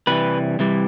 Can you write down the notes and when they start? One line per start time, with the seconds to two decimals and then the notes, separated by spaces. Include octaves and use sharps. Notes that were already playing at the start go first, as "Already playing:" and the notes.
0.07 C3 E3 G3 B4
0.59 C3 E3 G3